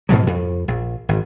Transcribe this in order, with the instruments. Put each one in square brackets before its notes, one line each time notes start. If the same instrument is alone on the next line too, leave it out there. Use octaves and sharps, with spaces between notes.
[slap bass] G#2 B2 F3 F#3
F2
A#1
G#1